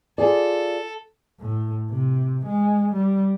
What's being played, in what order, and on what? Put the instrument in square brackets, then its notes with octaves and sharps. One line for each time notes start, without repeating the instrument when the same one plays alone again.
[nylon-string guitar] F4 G#4 D5 [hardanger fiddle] A4
[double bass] A2
C3
G#3
G3